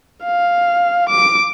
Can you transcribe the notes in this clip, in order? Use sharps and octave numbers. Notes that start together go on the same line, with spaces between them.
F5
D6